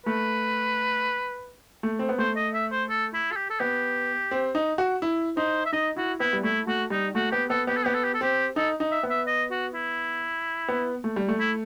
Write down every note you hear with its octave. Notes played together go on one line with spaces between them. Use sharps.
A3 B4
A3
C4
B3
A3 C5
D#5
E5
C5
A4
E4
A4
G4
A4
B3 G4
C4
D#4
F#4
E4
D#4 C5
E5
D#4 D#5
E4 F#4
B3 E4
G3
A3 E4
A3 F#4
G3 D#4
A3 F#4
B3 G4
B3 A4
B3 G4
A4
B3 G4
A4
G4
A4
C4 G4
D#4 A4
D#4
E5
B3
E5
D#5
F#4
E4
B3
A3
G3
A3
E4